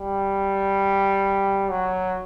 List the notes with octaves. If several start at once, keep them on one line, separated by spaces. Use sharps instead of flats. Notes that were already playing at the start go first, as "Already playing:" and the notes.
Already playing: G3
F#3